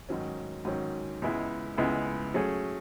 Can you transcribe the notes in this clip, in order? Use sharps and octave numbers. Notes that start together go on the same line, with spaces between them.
G#2 D#3 F#3 C#4
G#2 D#3 F#3 C#4
C#2 C#3 G#3 B3 E4
C#2 C#3 G#3 B3 E4
F#3 A3 C#4 G#4